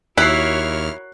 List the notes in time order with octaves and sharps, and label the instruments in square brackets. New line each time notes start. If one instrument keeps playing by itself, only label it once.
[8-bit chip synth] D#2 F6 [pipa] E4 [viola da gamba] F#4 A#4 C#5 [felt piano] F#6 C7